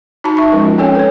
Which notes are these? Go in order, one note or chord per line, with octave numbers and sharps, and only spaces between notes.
D#4 F#4 A5 B5
E5 C#6
F3 G#3 C#4 A#4
F4
C4 C#4 A4 C#5 G5 G#5
B4 C#5